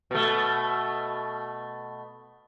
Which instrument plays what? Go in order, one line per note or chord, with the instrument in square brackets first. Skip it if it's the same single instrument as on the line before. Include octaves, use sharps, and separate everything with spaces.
[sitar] B2 A3